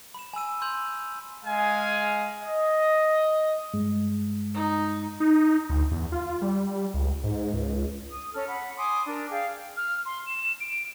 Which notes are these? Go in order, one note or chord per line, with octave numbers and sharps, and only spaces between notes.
B5 E7
G#5 B5 E6 D#7
C6 E6 G6 F7 F#7
G#3 G#4 F5 G#5
D#5
G2 G#3
D#4
D#4
D2
E2
F4
G3
C#2
G#2
C#2
D#6
C#4 A4 F6
F#5 B5
G#5 C6 D6 D#6
D4 A#4
G#4 D5 F5 G5
F6
C6
E7
D7